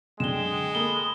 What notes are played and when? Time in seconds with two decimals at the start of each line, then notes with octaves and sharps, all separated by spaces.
0.20 F#2 D3 G#3 G5 E7 G7
0.75 A#3 A4 A#4 B5 D#6 G7